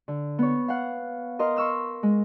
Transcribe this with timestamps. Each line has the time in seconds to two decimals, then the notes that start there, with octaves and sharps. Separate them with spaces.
0.08 D3
0.39 B3 C#5
0.68 F5 F#5
1.39 A#4 D#5 C6 F6
1.56 C6 C#6 E6 F6
2.03 G#3